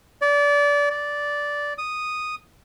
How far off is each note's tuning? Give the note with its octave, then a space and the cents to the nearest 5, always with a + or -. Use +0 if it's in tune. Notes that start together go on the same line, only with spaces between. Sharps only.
D5 -25
D5 -10
D#6 -5